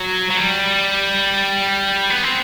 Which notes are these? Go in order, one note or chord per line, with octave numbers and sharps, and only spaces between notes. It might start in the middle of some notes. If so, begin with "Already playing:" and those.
Already playing: F#3
F#3
G3
B3
C4